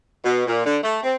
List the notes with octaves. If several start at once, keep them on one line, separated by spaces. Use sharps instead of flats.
B2
A#2
D3
A3
C4